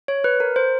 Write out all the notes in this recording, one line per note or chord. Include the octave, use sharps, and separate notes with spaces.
C#5
B4
A#4
C5